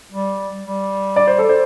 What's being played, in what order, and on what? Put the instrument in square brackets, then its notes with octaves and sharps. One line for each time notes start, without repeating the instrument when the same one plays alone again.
[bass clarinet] G3
G3
[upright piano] D5
C5
A4
C5